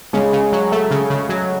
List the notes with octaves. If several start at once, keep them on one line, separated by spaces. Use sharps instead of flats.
C#3 G#3 G#4
C#3
F#3
A3
C#3
C#3
F#3